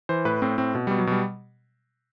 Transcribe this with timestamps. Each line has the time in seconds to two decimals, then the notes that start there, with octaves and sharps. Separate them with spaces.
0.09 E3 C5
0.25 A2 B4
0.42 A2 C4
0.58 A2 C4
0.75 B2
0.87 B2 G3
0.99 F#3
1.07 B2 G3